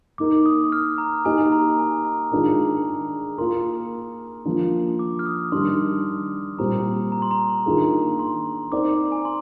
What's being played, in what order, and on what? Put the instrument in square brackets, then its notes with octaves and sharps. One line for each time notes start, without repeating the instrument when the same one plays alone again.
[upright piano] A#3 D#4 A#4 [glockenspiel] D6
[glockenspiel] D#6
F6
A#5
[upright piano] A#3 D#4 G4 A#4 D#5 [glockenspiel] G#5
[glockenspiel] A#5
G#5
A#5
[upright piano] D#3 G#3 D4 F4 A#4
[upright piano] A#3 F4 A#4 [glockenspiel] C6
[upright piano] F3 A#3 D4
[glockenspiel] D6
F6
D#6
[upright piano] D#3 G3 D4 [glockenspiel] C6
[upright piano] A#2 G3 C4 [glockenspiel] A#5
[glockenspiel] A#5
C6
A#5
[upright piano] D#3 A#3 D4 F4 G#4
[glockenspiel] C6
[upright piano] C4 D#4 A#4 D5 [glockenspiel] D6
[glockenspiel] G#5
A#5
C6